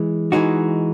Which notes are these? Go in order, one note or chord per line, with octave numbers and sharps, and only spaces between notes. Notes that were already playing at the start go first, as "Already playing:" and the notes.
Already playing: E3 G#3
E3 G#3 D#4 F#4